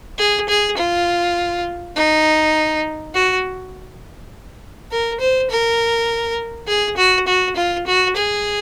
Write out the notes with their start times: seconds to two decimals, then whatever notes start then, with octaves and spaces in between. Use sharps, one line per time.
0.19 G#4
0.49 G#4
0.78 F4
1.96 D#4
3.14 F#4
4.91 A#4
5.20 C5
5.50 A#4
6.68 G#4
6.97 F#4
7.27 F#4
7.56 F4
7.87 F#4
8.16 G#4